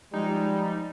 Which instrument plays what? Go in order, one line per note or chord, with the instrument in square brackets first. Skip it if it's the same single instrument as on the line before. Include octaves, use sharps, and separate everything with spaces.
[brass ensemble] F3 G3 [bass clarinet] G#3 [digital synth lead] D#4